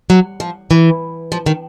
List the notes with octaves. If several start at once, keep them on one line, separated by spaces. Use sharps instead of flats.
F#3
F3
E3
F3
D#3